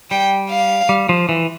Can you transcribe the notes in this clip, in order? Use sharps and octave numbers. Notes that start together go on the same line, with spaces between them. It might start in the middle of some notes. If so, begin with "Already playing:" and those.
G3 G5
F5
G3
F3
E3